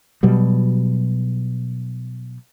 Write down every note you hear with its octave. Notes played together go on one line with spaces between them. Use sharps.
B2 F#3 G3